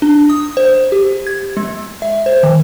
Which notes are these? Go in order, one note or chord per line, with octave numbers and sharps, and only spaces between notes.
D4
D#6
C5
G4
G#6
G#3
E5
C5
D#3